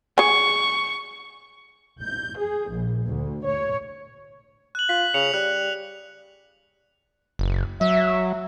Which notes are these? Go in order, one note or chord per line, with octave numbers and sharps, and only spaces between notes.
G#4 G#5 C#6
G6
G#4
A#1
D2
C#5
F#6 F#7
F4 B6
C#3 C#7 F7
G3 F#6
F#1
F#3 E5